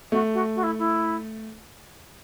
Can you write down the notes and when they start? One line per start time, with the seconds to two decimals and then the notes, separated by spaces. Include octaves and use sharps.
0.12 A3 F#4
0.33 F#4
0.55 F#4
0.62 E4
0.78 E4